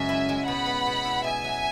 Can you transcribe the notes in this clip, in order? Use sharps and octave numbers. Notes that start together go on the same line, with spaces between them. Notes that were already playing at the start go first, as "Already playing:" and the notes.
Already playing: F#2 C#3 G#3 C#4 E5 G#5
E4
G#3
B2 F#5 B5
B3
B2
E4
B2 E5 G#5
F#3